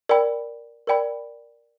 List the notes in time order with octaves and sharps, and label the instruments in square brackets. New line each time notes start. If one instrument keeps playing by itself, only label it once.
[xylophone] A#4 D5 G5 B5
A#4 D5 G5 B5